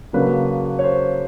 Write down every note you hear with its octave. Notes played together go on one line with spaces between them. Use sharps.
C#3 F#3 A#3 D4 B4
C#5
C5